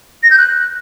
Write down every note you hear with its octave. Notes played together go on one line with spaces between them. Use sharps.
A#6
G6
F#6